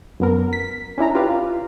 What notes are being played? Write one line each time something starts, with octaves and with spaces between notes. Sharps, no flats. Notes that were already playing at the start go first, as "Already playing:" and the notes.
F#2 B3 A#4
B6
C#4 D4 E4 A#5
F4 G4 B4 D5 F5